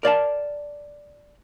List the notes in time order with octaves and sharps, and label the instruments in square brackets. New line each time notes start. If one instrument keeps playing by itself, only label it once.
[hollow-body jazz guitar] A#4 D5 F5 A5